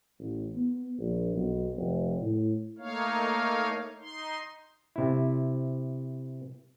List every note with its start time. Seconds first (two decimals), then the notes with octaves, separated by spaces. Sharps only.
0.19 A1
0.55 B3
0.98 A#1
1.34 B1
1.76 F1
2.21 A2
2.78 A3 A#3 D#4 C#5 F5
4.01 D#4 C6
4.96 C3 E4